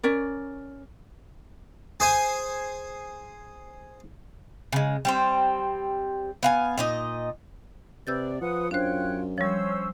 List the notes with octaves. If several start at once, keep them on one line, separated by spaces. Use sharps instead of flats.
C#4 A#4 D5
G#4 C5 G#5
C#3 G#3
G3 C4 C5
B3 F5 G#5
A#2 D#4 D#5
C3 B4 D5 E6 G6 A6
F3 B4 F#5 D#6
F#2 D4 F4 C5 C#5 G5 F#6
F3 G3 C#4 C5 C#5 E6